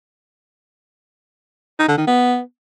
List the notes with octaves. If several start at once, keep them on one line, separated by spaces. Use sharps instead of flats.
D#4
D3
D#3
B3